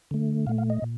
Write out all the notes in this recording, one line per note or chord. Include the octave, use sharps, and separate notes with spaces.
D3 A3
A#2 A3 F5
F5
D#5
A#2